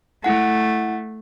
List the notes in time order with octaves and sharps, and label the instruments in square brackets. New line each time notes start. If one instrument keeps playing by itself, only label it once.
[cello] A3 [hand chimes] E4 F#5